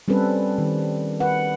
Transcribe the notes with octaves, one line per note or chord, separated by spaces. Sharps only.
G3 C4 C#4 A4 B4
D#3
B4 F#5